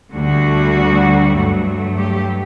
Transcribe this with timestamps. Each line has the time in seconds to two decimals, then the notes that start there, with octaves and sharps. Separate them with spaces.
0.13 D2 D3 G3 F#4
1.36 G2 F#3 A3
1.98 G4